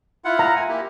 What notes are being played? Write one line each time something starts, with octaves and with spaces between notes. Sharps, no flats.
E4 F4 F#5
A#5
G#5
A#3 E4 G4